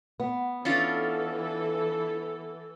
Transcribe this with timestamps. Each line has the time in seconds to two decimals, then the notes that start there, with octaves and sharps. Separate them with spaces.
0.20 B3
0.65 E3 C#4 D4 F4 A4